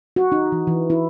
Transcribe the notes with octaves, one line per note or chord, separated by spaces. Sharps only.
F#4
D#4
E3
E3
E4